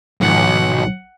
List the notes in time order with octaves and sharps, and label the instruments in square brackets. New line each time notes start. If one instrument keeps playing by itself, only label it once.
[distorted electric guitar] B1 [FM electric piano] G#2 D#3 F3 [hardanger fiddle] F#5